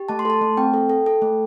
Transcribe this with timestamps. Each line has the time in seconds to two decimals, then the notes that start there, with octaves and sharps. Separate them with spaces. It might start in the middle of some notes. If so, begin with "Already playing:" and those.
Already playing: G4
0.09 A3 A5
0.19 C6
0.25 A4 A5
0.41 A3
0.57 C4 G5
0.74 A4
0.90 A4
1.06 A4
1.22 A3